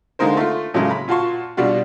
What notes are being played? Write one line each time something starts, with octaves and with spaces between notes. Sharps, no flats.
D3 G#3 A#3 D#4 A#4 C5
A3 F4
A2 C#3 F#3 G#3 A#3
B5
A#2 F4 F#4 A5 C6 C#6
B2 G3 D4 F4 F#4